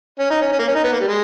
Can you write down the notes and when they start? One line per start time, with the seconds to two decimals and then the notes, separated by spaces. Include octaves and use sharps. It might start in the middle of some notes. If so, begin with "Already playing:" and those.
0.19 C#4
0.30 D#4
0.41 C#4
0.52 C#4
0.59 A#3
0.68 C#4
0.75 D#4
0.84 B3
0.92 A#3
1.00 G3
1.08 G#3